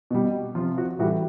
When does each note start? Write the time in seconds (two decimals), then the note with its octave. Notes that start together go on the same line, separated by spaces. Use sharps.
0.11 B2 G3
0.55 F3 F4
0.58 C3
0.78 F#4
0.99 A2 E3 G3 F#4